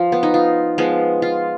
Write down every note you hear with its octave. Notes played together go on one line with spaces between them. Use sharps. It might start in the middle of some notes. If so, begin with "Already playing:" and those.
Already playing: F3 F4
B3
D#4
F4
F3 G#3 B3
F4